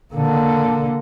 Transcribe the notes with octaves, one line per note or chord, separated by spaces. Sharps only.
D3 A#3